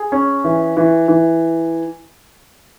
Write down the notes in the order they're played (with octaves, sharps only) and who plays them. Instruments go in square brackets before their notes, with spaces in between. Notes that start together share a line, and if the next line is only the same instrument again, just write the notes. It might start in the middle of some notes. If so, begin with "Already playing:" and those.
Already playing: [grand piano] G#4
C#4
E3
E3
E3